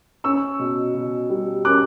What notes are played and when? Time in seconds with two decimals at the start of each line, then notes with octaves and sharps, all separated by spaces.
0.24 C#4 C#6 E6
0.59 B2
0.95 B2
1.30 G3
1.65 C#4 D6 F#6